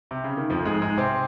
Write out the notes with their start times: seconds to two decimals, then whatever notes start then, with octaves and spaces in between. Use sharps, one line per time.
0.11 C3
0.24 C#3
0.37 D#3
0.50 F2 F3
0.65 G#2 G#3
0.82 G#2 G#3
0.97 C3 C4